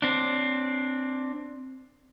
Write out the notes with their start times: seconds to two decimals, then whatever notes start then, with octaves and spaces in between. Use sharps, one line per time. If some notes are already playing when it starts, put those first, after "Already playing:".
0.02 C4 D4